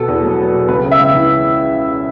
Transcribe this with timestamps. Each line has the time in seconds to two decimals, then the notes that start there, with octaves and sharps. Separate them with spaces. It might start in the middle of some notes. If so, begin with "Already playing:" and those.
Already playing: B2 B3 A4
0.08 E2
0.23 F#3
0.38 B3
0.53 B2
0.68 C#2 B4
0.84 C#3
0.91 E5
0.99 C#2
1.14 E3